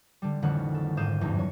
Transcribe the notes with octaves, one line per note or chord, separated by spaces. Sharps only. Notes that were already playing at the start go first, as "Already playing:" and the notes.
D3 G3
A1 F2 D3 D#3 C#4 F#5
A4
G#1 G#2 F5 D#6 G6 E7
F1 E2 G2 C#4 D#4
F#3 C#5